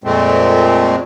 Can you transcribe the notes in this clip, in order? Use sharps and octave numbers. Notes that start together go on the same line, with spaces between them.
F2 A#2 G#3 A3 C4